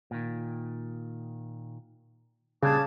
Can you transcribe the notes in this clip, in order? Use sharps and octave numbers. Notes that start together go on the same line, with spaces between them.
A#2 D#3
A#2 C#3 G3 D4 A5 D6 G#6